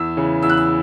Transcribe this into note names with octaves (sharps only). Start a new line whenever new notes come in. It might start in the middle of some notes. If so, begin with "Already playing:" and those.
Already playing: E2 E6
C#3 E3
E2 E6
F#6
E6